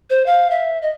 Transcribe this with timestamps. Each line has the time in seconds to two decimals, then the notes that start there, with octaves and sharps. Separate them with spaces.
0.10 C5
0.26 F5
0.51 E5
0.82 D#5